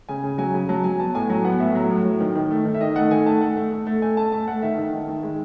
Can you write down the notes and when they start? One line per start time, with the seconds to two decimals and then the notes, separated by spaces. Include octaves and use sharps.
0.09 C#3 G#5
0.24 C#3
0.38 F#3 G#5
0.54 C#3
0.69 F#3 A5
0.84 F#3 G#5
0.99 B3 A5
1.14 A2 G#5
1.29 F#3 G#5
1.44 B3 F#5
1.59 A2 E5
1.75 F#3
1.90 A2
2.05 F#3
2.21 D#3
2.35 D#3
2.51 A3
2.65 D#3
2.75 E5
2.81 D#3 D#5
2.96 A3 F#5
3.11 D#3 G#5
3.26 A3 A5
3.41 A3 F#5
3.57 A3
3.72 A3
3.87 A3
4.02 A3 G#5
4.17 A3 A5
4.32 A3 A5
4.48 A3 F#5
4.62 D#3 E5
4.78 D#3
4.93 D#3
5.08 D#3
5.23 G#3